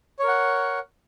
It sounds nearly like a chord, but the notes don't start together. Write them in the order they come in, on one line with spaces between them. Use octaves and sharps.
C#5 A#4 F#5